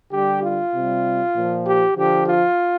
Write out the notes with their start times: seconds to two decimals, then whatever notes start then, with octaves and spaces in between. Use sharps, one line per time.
0.12 D3 G3 G4
0.42 F4
0.73 C3 G3
1.35 A#2 F3
1.65 G4
1.96 D3 F3 G4
2.27 F4